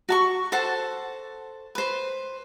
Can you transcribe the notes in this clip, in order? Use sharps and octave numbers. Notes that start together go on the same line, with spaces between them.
F#4 A5 C#6
A4 C5 F#5 A5
B4 C5